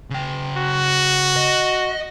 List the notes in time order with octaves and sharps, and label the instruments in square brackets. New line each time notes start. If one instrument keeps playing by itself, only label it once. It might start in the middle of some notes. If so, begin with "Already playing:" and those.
[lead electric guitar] C#3 G5
[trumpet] F#4
[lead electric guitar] D#5